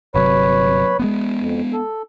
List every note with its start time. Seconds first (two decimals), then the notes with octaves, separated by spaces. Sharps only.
0.15 G1 C3 F#3 B4 C#5 B5
1.00 G#3 A#3 B3
1.40 F2
1.73 A4